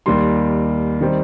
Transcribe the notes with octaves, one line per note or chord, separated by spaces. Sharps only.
D#2 D#3 G3 C6
D#3 G3 C4